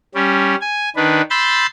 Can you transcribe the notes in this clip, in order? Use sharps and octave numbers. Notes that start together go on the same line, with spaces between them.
G3 C#4
G#5
D#3 D4 B4
B5 C6 E6 G6 A6